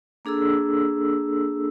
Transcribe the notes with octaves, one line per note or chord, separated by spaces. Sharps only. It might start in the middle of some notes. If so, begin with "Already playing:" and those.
A#3 D4 G#4 A4 E6